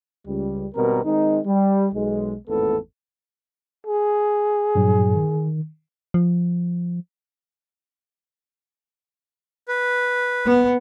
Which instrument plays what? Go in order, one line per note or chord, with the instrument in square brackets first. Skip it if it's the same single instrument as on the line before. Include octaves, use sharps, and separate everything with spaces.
[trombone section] C#2 G3
G#1 B2 G3 C4 A#4
D#3 G#3 C4 D#4
G3
B1 G#3
G#1 E2 A2 A3 B3 A4
[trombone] G#4
[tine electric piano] G2 A#2 F#3
D#3
[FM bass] F3
[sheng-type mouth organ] B4
[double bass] B3